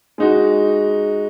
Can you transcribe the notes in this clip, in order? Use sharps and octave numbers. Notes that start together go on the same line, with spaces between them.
G#3 D#4 F#4